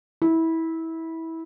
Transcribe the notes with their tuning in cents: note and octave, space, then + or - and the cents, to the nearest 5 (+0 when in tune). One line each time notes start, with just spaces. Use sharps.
E4 -20